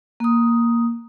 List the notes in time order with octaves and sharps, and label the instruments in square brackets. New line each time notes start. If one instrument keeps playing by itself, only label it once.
[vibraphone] A#3 D#6